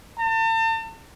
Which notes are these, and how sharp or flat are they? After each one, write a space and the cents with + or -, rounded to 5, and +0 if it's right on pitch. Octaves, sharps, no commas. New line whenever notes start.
A5 +40